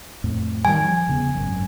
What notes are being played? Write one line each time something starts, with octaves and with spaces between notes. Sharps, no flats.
F2 A2
D#3 E3 G3 G#5
F3
E1 C#3 B3
G#1 F#2